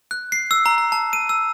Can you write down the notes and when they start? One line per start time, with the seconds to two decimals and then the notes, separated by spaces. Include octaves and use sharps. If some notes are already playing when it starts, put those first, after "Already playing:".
0.11 F#6
0.32 C7
0.51 E6
0.66 A#5
0.78 A#5
0.92 A5
1.13 D#7
1.29 E6